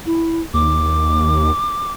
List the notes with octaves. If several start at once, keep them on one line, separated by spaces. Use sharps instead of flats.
E4
D#2 D6